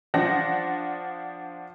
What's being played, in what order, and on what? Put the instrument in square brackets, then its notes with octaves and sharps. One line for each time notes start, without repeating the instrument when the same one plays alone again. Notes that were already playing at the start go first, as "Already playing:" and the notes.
[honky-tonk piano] F3 D4 F#5 A#6